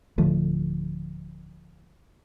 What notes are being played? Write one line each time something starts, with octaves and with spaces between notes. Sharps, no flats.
D1 D3 F3 A3